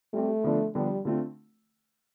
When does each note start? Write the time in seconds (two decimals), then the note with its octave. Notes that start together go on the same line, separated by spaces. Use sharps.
0.14 G3 A3 C4 G4
0.44 D3 F3 B3 D4
0.75 D3 F3 G3 B3 D4 G4
1.05 D3 A3 C4 F4